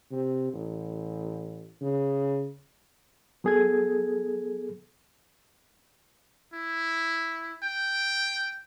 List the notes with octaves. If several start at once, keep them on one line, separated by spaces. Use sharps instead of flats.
C3
A1
C#3
F#3 B3 G#4 A4 G#6
E4
G5